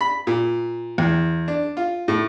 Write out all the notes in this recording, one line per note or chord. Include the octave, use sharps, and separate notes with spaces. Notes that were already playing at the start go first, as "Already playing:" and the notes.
B5
A#2
E2
D4
F4
A2